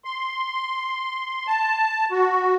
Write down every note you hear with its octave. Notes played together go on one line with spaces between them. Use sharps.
C6
A5
F#4